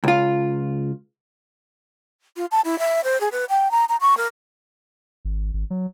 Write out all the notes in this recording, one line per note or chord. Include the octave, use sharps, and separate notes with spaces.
C#2 F4
F4
A5
E4
E5
C5
G#4
B4
G5
A#5
A#5
C#6
A#4
G#1
G#1
F#3